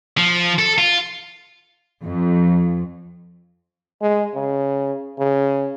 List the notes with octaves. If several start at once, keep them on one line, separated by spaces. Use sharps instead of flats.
F3
A4
F4
F2
G#3
C#3
C#3